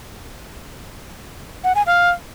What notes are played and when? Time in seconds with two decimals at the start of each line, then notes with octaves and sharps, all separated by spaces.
1.64 F#5
1.75 G#5
1.87 F5